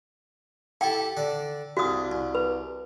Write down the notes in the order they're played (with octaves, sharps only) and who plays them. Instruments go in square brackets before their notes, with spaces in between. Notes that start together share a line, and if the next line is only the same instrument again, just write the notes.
[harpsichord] E4 G4 A4 [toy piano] G5
[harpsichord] D3 D5
[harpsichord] C2 G2 [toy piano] F#4 D#6
[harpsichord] C2
[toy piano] B4